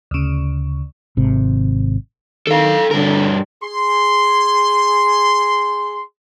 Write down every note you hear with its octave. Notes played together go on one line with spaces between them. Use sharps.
D2 C#3
G#1 C3
D#3 A4 F5
G2 D3 A#4
G#4 C6